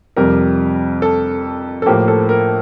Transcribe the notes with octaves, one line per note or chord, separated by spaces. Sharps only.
F2 C3 G3 A#4
A4
A4
A2 F3 A#3 G4
A4
A#4